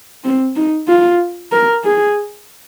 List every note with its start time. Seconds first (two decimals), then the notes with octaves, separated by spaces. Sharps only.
0.24 C4
0.56 D#4
0.88 F4
1.52 A#4
1.84 G#4